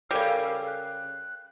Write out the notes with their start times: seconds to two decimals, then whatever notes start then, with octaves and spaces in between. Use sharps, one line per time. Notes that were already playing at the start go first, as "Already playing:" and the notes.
0.11 C#3 G3 A4 A#4 F5
0.67 F#6